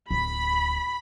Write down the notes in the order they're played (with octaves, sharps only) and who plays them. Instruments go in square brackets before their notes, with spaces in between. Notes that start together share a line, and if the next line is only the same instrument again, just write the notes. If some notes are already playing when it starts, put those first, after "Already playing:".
[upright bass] D1 [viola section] B5